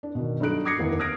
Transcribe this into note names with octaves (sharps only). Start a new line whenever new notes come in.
D4
B2 D#3
G2 F#3 D#4 A4 F#6 D7
D6 D#6 G#6 A#6 C7 C#7
F1 D#2 B3 E4 A#4
D#6 F6 F#6 G#6 A#6 D7